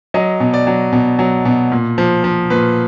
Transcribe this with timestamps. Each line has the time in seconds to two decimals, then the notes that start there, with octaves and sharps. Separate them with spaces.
0.14 F#3 D#5
0.40 B2
0.54 D5
0.67 F#3
0.93 B2
1.19 F#3
1.45 B2
1.72 A#2
1.98 F3
2.24 F3
2.50 A#2 B4